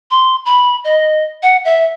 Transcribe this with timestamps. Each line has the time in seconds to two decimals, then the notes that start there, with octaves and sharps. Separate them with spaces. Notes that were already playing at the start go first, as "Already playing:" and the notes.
0.11 C6
0.46 B5
0.84 D#5
1.43 F#5
1.65 E5